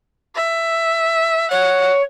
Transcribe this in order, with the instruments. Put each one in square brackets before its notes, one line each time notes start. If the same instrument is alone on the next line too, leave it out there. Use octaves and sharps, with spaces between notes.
[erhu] E5
[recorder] C#5 [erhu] F#5